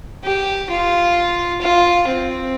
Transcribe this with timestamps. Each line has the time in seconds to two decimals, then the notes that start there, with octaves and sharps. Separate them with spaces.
0.25 G4
0.70 F4
1.61 F4
2.07 C4